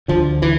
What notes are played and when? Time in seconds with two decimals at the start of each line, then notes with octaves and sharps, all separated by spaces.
0.08 D2 D3 F3
0.42 E3